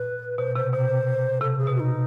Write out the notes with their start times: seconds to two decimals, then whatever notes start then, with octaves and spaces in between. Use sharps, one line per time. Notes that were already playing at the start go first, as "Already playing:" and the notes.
Already playing: A#2 B4
0.38 B2 C5
0.55 C3 C5
0.73 B2 C5
1.41 C3 A4
1.58 G#4
1.67 B2
1.75 F#4
1.80 D#4